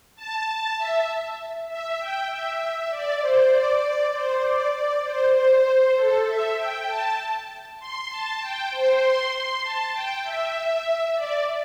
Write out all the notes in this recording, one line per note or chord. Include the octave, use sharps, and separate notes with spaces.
A5
A5
E5
E5
G5
E5
D5
C5
D5
C5
D5
C5
C5
A4
E5
G5
A5
C6
A5
G5
C5
C6
C6
A5
G5
E5
D5